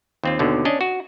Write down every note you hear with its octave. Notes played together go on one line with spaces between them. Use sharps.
D#2 C4 F4
D#2 B2 D3
C#4 D4 D#5
F#4